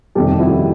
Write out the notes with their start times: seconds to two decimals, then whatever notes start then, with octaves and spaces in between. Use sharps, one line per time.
0.15 F2 C3 D#3 G3 G4 A4
0.40 E4 F#4